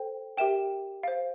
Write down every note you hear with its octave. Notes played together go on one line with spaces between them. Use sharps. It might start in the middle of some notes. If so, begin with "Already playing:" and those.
Already playing: A4 C5 G5
G4 A#4 E5 G5 E7
C5 F5